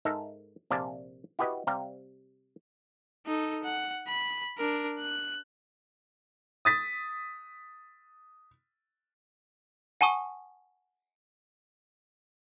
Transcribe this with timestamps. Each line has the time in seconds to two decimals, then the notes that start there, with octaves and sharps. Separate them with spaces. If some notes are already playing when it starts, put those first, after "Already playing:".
0.05 G#2 D#4 A4 A#4 E5
0.70 A#1 C3 D5 F5 G#5 A5
1.39 E4 F#4 G4 B4 D#5
1.67 C3 G3 F5 G5 A#5
3.27 D#4 A4
3.64 F#5
4.08 B5
4.58 D4 A#4
4.99 F#6
6.65 D#6 A6 B6
10.01 F#5 G#5 A5 C#6 D#6